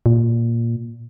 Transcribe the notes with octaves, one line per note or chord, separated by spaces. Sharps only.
A#2